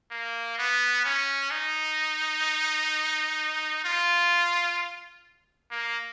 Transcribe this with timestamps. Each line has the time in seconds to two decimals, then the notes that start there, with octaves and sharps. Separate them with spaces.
0.11 A#3
0.59 B3
1.05 C#4
1.51 D#4
3.85 F4
5.71 A#3